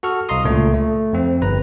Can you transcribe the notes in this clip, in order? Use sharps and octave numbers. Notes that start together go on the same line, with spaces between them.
F#4 A4 C#6 F6
C2 D#5 F5 A#5 C6 D#6
C#2 A#2 A3
A3
F2 C4
G1 B4 A#5